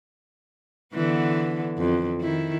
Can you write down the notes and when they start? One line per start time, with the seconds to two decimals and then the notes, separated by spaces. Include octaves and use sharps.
0.94 D3 E3 B3
1.78 F2
2.21 D#3 E4